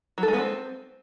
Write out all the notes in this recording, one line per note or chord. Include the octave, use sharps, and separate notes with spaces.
F#3
A4
G#3
B3
C4